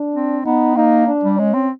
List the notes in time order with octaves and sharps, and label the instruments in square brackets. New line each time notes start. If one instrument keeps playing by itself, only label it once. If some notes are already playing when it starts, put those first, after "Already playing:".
Already playing: [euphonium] D4
[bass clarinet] C4
[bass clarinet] B3 [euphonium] D#4
[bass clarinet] A#3 [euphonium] D#4
[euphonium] D4
[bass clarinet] G3
[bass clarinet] G#3 [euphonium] C#4
[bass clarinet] C4